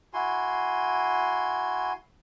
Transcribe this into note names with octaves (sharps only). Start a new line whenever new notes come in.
E4 F#4 G#5 C6